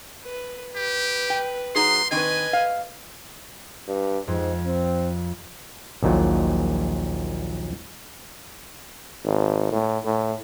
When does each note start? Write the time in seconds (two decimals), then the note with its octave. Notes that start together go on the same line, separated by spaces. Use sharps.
0.23 B4
0.76 G4 B4
1.30 G5
1.75 F#3 D#4 G#4 C6
2.11 D#3 C4 D4 B4 D#5 G#5
2.53 F5
3.88 G2
4.28 F2 G#2
4.66 C4
6.03 A#1 D#2 A#2 F#3
9.24 G#1
9.72 A2
10.05 A2